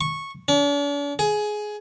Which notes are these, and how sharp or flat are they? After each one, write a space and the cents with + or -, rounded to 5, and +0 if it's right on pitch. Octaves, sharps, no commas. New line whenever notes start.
C#6 -10
D4 -45
G#4 +15